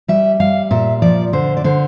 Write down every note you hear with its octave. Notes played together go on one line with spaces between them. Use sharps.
G3 E5
G3 F5
A#2 E5
F3 D5
D3 C5
D5
D3 C5